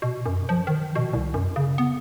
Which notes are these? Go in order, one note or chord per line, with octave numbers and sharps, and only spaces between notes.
B2
F#2
F3
D#3
B2
C2
F#2
C#3
B3